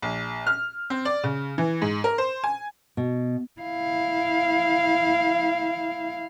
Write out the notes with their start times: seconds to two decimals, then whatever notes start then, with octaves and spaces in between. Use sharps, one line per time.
0.02 A#1
0.47 F6
0.90 C4
1.05 D5
1.24 C#3
1.58 E3
1.82 G#2
2.04 A#4
2.18 C5
2.44 G#5
2.97 B2
3.61 E4 F5